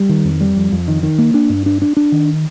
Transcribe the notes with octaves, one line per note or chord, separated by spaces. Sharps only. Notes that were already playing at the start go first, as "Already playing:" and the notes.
Already playing: G3
D#3
F2
G3
F2
F2
D#3
D#3
A#3
D4
G2
D4
D4
D4
D#3